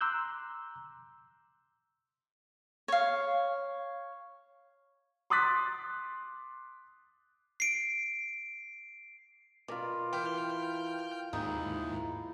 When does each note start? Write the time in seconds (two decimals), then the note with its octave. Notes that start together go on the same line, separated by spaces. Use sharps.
0.01 A#5 C6 D6 E6 F#6 G6
2.88 C#5 F5
5.30 C6 D6 D#6 F#6 A6 B6
7.60 C7 D7
9.68 B2 F4 A#4 D5
10.13 E3 G5 F6 G6
11.33 D#2 G#2 D#4 E4